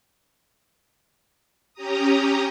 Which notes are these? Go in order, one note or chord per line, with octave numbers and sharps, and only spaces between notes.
C#4 G4 A#5 D#6